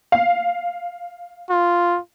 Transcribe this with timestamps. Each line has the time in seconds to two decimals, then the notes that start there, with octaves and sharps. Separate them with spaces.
0.12 F5
1.50 F4